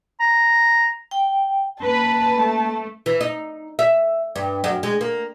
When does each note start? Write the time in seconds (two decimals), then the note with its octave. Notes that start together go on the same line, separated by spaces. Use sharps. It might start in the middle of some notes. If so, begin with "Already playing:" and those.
0.20 A#5
1.11 G5
1.84 A#3 C#4 B4 A5
2.37 A3
3.06 E3
3.21 D#4
3.79 E5
4.36 G2
4.64 F#2
4.83 G#3
5.01 A#3